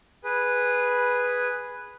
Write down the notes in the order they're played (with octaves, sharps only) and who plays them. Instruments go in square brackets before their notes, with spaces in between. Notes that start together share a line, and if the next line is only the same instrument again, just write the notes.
[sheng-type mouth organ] G#4 B4